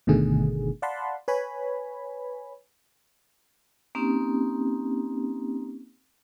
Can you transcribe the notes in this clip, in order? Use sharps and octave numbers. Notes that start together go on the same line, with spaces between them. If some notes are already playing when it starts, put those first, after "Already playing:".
G1 B2 D3 D#3 A3 G#4
D5 F5 F#5 A5 B5 C6
B4 C#5 G#5 B5
A#3 C4 C#4 D#4 G4